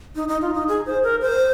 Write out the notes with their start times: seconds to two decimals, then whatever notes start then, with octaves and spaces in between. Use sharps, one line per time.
0.16 D#4
0.28 D#4
0.41 F4
0.54 D#4
0.68 G#4
0.86 C5
1.03 A#4
1.21 C5